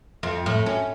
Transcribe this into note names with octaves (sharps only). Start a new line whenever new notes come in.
F2
A2
C#4